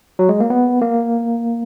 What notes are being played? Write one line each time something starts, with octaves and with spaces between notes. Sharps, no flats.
F#3
G#3
A#3
B3
A#3